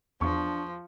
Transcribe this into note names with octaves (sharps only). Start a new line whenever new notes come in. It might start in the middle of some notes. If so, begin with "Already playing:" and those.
E2 F3 D4 C#6